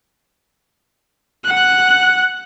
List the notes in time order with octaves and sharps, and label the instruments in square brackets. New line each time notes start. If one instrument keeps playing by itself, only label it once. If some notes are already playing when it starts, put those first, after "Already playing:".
[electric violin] F#5 F#6